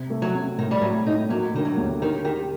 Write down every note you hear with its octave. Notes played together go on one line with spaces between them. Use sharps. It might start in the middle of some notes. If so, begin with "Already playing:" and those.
Already playing: C3
A3
F#3
C3
A2 D#3
G3
A2 F#3
A2 D#4
F#3 A#3
D3 D#3
F#3
D#2
D#3 G4
D#3 G4